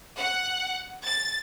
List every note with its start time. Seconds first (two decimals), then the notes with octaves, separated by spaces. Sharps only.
0.19 F#5
1.04 A6